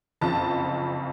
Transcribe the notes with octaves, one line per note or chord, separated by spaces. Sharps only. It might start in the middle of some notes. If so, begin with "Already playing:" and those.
F#1 F2 C#3 A5